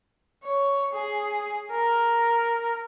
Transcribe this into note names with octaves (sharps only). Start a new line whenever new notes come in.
C#5
G#4
A#4